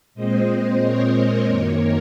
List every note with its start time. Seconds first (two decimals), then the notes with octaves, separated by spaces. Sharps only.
0.15 A#2 G#3 C4 C5 D#5
0.80 A#4 C#5
1.47 F#2 D#3 A#3